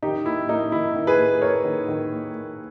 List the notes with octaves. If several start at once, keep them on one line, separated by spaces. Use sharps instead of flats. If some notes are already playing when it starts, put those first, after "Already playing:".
D#3 D#4 G4
A#3 E4
A#3 D#4
D#3 E4
D#3
G#4 B4
A#3
A#3 A#4 C#5
D#3
D#3
A#3
A#3